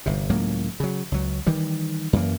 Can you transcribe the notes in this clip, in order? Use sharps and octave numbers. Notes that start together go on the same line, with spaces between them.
G1 C3
C#2 A2 F#3 A#3
C#3 F#3
C#2 F#3
D#3 E3 G3
F#2 E3 A#3